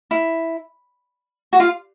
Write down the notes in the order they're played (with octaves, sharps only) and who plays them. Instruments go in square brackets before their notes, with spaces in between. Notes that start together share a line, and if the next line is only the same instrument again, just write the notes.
[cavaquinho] E4
F#4
F4